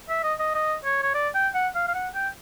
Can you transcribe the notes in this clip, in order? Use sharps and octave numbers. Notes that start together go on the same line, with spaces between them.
E5
D#5
D#5
D#5
C#5
C#5
D5
G5
F#5
F5
F5
F#5
G5